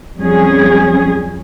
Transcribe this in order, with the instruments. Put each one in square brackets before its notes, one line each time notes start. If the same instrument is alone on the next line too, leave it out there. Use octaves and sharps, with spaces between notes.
[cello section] F2 F#3 G3 C#4 G#4